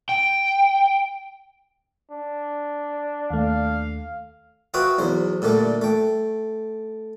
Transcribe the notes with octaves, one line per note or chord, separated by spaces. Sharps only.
G5
D4
D#2 A3 F5
F4 F#4 B4 E5 G5 D#6
B1 E2 C5
A#2 D3 G3 A3
A3 G5